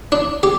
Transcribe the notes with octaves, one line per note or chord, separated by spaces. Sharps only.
D4
G4